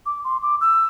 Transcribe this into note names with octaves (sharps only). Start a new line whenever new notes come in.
D6
C6
D6
E6